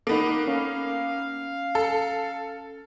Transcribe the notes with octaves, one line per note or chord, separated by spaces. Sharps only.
A#3 B3 D#4 A4
C#4 F5
A4